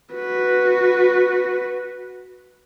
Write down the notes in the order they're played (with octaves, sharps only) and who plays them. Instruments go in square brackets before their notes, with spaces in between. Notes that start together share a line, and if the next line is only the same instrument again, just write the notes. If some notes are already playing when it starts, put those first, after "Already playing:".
[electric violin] F#4 B4